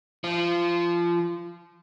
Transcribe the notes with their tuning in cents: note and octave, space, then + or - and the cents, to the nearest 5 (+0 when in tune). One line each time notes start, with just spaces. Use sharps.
F3 -20